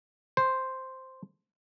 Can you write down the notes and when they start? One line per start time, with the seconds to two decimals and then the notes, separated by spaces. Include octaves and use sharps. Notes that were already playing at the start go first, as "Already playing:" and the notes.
0.37 C5